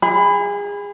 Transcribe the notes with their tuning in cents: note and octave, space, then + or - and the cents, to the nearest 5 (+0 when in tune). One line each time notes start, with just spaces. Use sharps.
G#4 -30 B5 +15